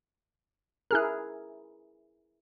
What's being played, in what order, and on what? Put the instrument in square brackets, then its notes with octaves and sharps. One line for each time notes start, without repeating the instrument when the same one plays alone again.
[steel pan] E4 G#4 A#4 [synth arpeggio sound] F6 F#6